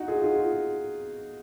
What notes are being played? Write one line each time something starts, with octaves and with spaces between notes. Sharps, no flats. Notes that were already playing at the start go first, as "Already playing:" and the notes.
Already playing: D#4 F#4
F4 G#4
F4 G#4